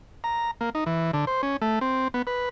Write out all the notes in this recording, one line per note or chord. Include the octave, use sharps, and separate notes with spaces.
A#5
A#3
D#4
E3
D3
C5
C#4
A3
C4
B3
B4